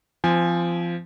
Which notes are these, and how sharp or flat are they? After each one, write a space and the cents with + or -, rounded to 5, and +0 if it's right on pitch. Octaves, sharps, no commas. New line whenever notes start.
F3 -20 C4 -25 G#5 +0